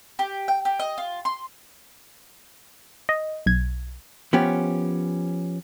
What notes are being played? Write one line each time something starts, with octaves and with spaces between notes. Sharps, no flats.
G4
G5
G4
D#5
F4
C6
D#5
B1 G#6
F3 B3 C#4 G4